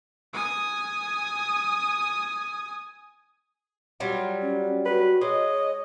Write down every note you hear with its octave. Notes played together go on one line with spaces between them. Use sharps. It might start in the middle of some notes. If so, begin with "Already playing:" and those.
G#5 D#6
F#3 G3 F4
C#4
F#4 B4
G#3 C#5 D#5